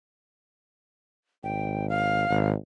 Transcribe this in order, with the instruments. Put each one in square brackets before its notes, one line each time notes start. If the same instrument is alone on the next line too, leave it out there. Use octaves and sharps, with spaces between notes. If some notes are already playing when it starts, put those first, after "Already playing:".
[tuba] G#1 [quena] G5
[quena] F5
[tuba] G#1